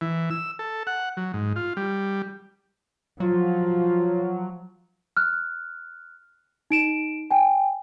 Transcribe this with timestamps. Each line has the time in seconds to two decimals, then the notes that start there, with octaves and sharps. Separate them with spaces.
0.01 E3
0.30 E6
0.59 A4
0.87 F#5
1.17 F#3
1.34 G#2
1.56 F4
1.77 G3
3.20 F3 F#3 F4
5.17 F6 F#6
6.71 D#4 D7 E7
7.31 G5 G#5